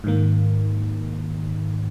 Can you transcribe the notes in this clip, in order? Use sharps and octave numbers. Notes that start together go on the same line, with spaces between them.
G#2 D#3 A#3